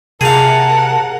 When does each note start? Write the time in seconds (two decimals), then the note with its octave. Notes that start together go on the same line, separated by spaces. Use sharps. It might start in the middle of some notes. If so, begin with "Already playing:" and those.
0.21 C3 G#4 A#4 F5 F#5 A5